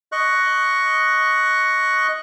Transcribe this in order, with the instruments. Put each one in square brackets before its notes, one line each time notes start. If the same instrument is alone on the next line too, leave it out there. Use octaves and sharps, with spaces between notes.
[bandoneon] D#5 C#6 F#6